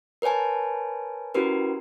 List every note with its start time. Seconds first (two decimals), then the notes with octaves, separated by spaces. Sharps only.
0.22 A#4 B4 C#5 G#5 A5
1.34 C#4 E4 F#4 G4 A#4 B4